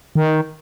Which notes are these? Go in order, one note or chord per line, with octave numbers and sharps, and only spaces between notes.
D#3